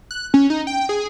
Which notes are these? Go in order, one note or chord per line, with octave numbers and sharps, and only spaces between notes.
F#6
C#4
D#4
G5
G#4